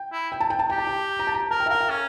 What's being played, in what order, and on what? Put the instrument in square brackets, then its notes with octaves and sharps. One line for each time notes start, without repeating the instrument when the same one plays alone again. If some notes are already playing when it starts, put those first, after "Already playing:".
Already playing: [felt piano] G5
[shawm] E4
[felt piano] G5
A5
G5
A5
[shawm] G4 [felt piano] G5
[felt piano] A5
G5
A#5
A5
A#5
[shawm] A#4 [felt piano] A5
[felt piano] G5
E5
[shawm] A#4 [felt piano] F5
[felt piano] G5
[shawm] C#4